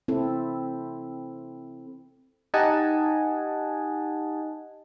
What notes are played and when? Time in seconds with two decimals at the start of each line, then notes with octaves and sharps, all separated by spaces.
0.08 C4 E4 A4
2.54 D#4 G4 D#5 F#5 G#5 A5